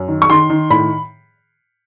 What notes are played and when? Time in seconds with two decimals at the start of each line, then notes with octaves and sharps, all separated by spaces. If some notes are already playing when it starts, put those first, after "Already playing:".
Already playing: F#2
0.08 D#3
0.22 C#6
0.30 D#3 C6
0.50 D#3
0.70 A2 B5